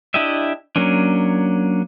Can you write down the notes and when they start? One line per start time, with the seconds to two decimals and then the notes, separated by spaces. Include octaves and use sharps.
0.14 D4 E4 G4 D#5 E5
0.76 F#3 A#3 C#4 D4